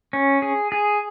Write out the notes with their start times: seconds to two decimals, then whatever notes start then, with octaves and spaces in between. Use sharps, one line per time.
0.13 C#4
0.42 G#4
0.72 G#4